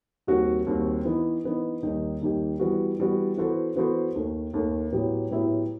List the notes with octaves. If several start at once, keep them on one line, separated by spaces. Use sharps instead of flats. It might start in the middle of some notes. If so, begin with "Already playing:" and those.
D#2 D#3 G3 C4 F#4
D#2 D#3 G3 C4 F#4
E3 B3 D#4
E3 B3 D#4
D#2 D#3 G3 D#4 G4
D#2 D#3 G3 D#4 G4
E3 G3 B3 F#4
E3 G3 B3 F#4
E3 B3 F#4 A4 C5
E3 B3 F#4 A4 C5
D#2 D#3 A3
D#2 D#3 A3
A2 F#3 B3 E4 G4
A2 F#3 B3 E4 G4